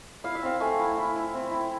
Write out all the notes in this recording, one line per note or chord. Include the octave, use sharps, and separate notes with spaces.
E4 F5
E5
C4 F5
A3 G#5
E4
E4
E4
C4
E4